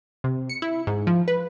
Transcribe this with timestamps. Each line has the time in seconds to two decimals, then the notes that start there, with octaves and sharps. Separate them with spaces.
0.24 C3
0.49 C#7
0.62 E4
0.87 G#2
1.07 F3
1.28 B4